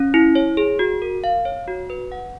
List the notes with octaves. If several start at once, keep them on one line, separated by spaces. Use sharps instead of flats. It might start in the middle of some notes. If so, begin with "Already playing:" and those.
Already playing: C#4
E4
C#5
G#4
F#4
A#4
F5
C#5
F#4
B4
F#5